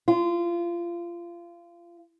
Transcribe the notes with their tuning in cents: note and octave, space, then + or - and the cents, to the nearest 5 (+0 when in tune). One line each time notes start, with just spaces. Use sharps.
F4 -25